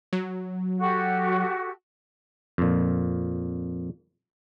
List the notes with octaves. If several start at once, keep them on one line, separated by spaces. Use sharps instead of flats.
F#3
F#4 G4 A4
F2 A#2